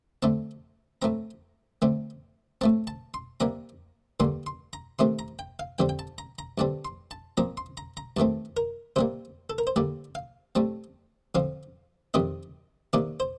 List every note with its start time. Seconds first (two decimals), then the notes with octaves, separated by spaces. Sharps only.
0.22 D3 A3 C4 A5
1.02 A2 A3 C4 A#5
1.82 D3 A3 C4
2.61 A2 A3 C4 A5
2.87 A5
3.14 C6
3.40 C3 G3 A#3 A#5
4.20 G2 D3 G3 A#3 C6
4.46 C6
4.73 A#5
4.99 C3 D#3 A3 C4 C6
5.19 A#5
5.39 G5
5.59 F5
5.79 F2 D3 G3 C4 G5
5.89 G5
5.99 A5
6.18 A#5
6.39 A#5
6.58 G2 D3 G3 C4 A5
6.85 C6
7.11 A5
7.37 A#2 F3 C4 A#5
7.57 C6
7.77 A#5
7.97 A#5
8.17 G2 D#3 A3 C4 A5
8.57 A#4
8.96 C3 G3 A#3 C5
9.50 A4
9.58 A#4
9.67 C5
9.76 D3 G3 A#3 D5
10.15 F5
10.55 A2 G3 C4 A5
11.35 D3 F3 C4 F5
12.14 F2 C3 D#3 G3 C4 D#5
12.93 C3 D#3 A#3 D5
13.20 C5